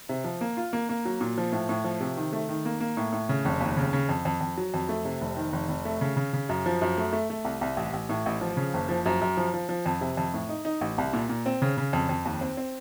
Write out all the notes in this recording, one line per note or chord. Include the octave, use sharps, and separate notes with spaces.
C3
F3
A#3
F4
A#3
A#3
F#3
A#2
F3
A2
A2
F3
C3
D#3
A3
D#3
A#3
A#3
A2
A2
C#3
F1
D#2
C#3
C#3
F2
F2
F2
F#3
F2
A3
C3
F1
D#3
F1
F1
A3
C#3
C#3
C#3
F#2
F3
F#2
A3
A3
A3
C2
C2
A1
A1
A2
A1
F3
C#3
F#1
F3
F#2
F#2
F3
F3
F3
F2
C3
F2
A2
D#4
D#4
A1
C2
A#2
A#2
C4
C#3
C#3
F2
F2
D#2
C4
C4